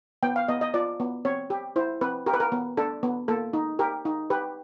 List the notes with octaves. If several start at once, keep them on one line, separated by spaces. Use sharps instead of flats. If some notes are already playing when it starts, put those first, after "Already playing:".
B3 G5
F5
B3 D#5
D#5
F4 D5
B3
C4 C#5
G4
E4 C5
C4 B4
G4 A#4
B4
A#4
B3
D4 A4
B3
A#3 A4
D#4
G4 A#4
D#4
G4 B4